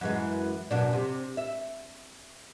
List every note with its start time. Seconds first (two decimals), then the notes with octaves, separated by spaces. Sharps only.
0.01 F#2 E3 G#3
0.71 F#2 B2 D4
0.93 C3
1.37 E5